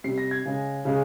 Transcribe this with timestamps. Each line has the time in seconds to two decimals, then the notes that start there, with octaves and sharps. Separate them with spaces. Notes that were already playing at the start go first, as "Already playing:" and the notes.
0.04 C3 G3 C7
0.18 A#6
0.31 G#6
0.45 C#3 G#3
0.85 C#3 G#3